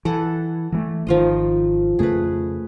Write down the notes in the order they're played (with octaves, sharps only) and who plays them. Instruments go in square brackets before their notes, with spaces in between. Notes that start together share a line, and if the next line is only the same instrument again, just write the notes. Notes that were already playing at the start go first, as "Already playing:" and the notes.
[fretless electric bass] E3 [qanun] A4 F#5
[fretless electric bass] E3 G3 A3
[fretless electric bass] G#1 D#3 [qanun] F3 F4 D#5
[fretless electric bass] F2 C#3 A3 [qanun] G#4 B4